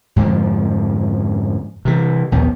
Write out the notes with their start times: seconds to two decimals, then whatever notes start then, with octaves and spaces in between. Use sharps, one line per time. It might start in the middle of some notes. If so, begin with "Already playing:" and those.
0.16 F2 G#2 D3 F3
1.85 C3 E3
2.32 A#1 D#2 B3